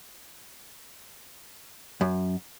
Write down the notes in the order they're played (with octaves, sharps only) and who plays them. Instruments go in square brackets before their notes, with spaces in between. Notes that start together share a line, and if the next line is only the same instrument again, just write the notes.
[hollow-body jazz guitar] F#2